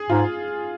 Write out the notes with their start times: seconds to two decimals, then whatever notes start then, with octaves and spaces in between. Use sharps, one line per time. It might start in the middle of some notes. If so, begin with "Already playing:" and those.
Already playing: G#4
0.10 G#2 F4